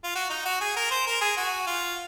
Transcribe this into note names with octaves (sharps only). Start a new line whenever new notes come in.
F4
F#4
D#4
F#4
G#4
A#4
C5
A#4
G#4
F#4
F4